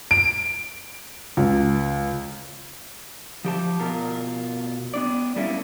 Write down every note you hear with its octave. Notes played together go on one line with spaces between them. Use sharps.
D7
C#2
F3 G4 A5
B2 F4 A#4
B3 D4 D5
G3 A3 A#3 C#4 E4